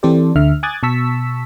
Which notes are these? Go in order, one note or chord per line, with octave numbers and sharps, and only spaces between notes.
E3 C4 G4 A4 C5 D5
D2 D3 E5 F6
G#5 D6 D#6 F#6 G#6 A6
B2 A5 C#6 E6 B6